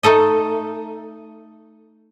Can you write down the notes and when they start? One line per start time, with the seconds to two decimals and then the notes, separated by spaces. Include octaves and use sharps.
0.03 A3 D#4 A4 D#5